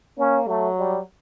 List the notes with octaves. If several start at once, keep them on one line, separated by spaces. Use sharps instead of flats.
A#3 C#4
F#3 A3
G3